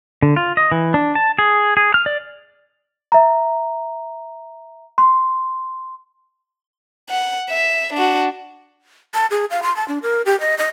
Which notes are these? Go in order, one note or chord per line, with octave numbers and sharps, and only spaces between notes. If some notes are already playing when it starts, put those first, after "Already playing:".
D3
F4
D#5
E3
D4
A5
G#4
G#4
F6
D5
E5 A#5
C6
F#5
E5
D4 F#4
A5
G#4
F5
C6
A5
D4
A#4
G4
D#5
D#5